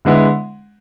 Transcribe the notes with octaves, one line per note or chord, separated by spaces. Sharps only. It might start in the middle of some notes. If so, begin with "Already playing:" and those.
D3 G#3 B3 E4